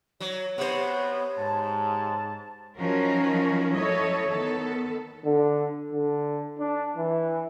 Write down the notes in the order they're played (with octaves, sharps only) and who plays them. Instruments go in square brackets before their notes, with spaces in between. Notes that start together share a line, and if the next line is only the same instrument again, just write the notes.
[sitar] F#3 [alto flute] C#5
[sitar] C3 C5 [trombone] B3 [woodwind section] F#5 C#6
[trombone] G#2 [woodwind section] A5
[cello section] F3 F#3 C#4 D#4 F#4 A#4
F#3 A3 E4 A4 C#5 D#5
D#3 B3 A4
[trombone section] D3
D3
D4
E3